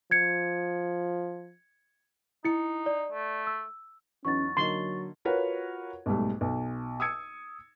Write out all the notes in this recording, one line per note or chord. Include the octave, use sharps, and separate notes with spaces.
F3 G#6 C#7
D#4 E4 C#7
D5
A3
E6
E2 F#3 C#4 D#4 C#6 A6
D3 F#3 A#3 D#4 C6
F4 F#4 A#4 B4 C#5 F#5
B1 G#2 G3 A3
B1
D#6 E6 G#6 C#7